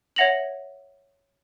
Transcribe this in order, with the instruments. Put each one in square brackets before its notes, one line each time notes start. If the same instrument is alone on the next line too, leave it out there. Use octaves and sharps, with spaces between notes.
[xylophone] C#5 E5 F#5 A#6 F7 F#7